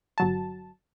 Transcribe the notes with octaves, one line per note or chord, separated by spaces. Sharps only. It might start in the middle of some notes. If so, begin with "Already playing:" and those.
G1 F#3 A5